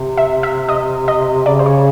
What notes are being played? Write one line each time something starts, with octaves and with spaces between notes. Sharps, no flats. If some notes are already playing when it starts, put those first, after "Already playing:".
Already playing: C3
E5
E5
D#5
D#5
C#3 D5
C5
C#5